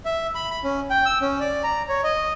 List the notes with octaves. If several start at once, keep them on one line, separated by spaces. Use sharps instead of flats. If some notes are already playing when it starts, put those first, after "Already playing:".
E5
B5
B5
C#4
G5
E6
C#4
D5
A#5
C#5
D#5